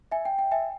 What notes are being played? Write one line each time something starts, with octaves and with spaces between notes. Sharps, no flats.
E5 G#5
G5
G5
E5 G#5